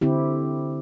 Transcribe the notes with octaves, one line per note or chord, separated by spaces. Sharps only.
D3 C4 E4 G4